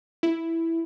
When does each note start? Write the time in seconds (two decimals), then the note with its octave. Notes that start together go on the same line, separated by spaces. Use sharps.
0.23 E4